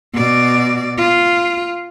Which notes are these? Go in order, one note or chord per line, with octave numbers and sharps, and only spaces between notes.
B2 D5
F4